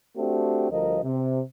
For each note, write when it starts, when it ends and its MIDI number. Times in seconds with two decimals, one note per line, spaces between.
0.17 0.70 57
0.17 0.70 60
0.17 0.70 62
0.17 0.70 66
0.17 0.70 67
0.70 0.99 38
0.70 0.99 53
0.70 0.99 55
0.70 0.99 70
0.70 0.99 75
1.04 1.40 48